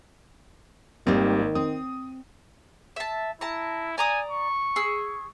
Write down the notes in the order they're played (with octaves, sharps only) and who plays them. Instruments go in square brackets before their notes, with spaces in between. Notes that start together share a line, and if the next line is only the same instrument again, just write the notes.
[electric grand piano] G#1 A#3 [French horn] D#3 [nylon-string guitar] G3 C4
[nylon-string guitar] C4 [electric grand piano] D#6
[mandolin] E5 A5
[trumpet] E4 [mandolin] A5 A#5
[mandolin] D5 A#5 D#6 [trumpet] G#5
[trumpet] C#6
[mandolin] G#4 E6